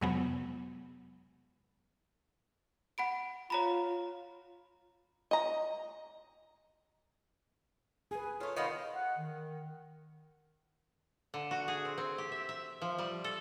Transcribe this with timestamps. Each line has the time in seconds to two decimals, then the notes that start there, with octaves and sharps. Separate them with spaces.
0.01 F2 C3 F#3 G#3 B3
2.98 F#5 B5 D7
3.50 F4 C#5 A#5 B5
5.31 D#5 A#5
8.11 G#4 B4 G#5
8.40 A3 F4 C#5
8.56 D#3 B3 F4 F5
8.94 F#5
9.17 D#3
11.34 D3
11.51 F#4
11.68 G#4
11.85 C4
11.98 C4
12.18 G4
12.32 E5
12.49 E5
12.82 F3
12.98 G3
13.24 A4